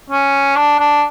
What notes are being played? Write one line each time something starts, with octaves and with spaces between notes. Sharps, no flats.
C#4
D4
D4